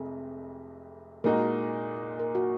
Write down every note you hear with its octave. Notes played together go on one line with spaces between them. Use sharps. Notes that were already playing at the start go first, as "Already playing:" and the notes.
Already playing: F1 F2 C3 G#4
A#2 G#3 D#4 F#4 A#4
A#4
F#4